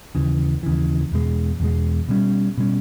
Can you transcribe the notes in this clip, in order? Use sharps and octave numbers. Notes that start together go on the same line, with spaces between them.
D#2 C#3 E3
D#2 C#3 E3
E2 B2 G#3
E2 B2 G#3
B2 G3 C#4
B2 G3 C#4